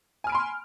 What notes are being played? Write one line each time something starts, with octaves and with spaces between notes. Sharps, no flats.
G#5 B5 C6 F6 D7